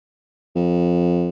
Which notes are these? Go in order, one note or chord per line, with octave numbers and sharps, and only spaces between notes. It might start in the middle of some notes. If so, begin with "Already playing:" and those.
F2